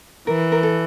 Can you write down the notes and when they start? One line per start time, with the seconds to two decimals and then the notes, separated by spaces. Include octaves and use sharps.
0.27 E3 A#4
0.52 A#4
0.63 A4